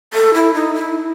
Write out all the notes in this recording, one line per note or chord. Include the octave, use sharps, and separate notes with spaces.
A4
E4
D#4
E4